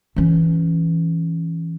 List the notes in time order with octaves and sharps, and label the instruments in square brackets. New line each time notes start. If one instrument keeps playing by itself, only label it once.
[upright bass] E3 C#4